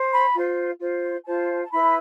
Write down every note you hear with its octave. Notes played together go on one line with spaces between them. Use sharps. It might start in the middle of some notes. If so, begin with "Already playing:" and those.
Already playing: C5
B5
F4 C5
F4 C5
F4 C5 A5
A5
E4 B4 B5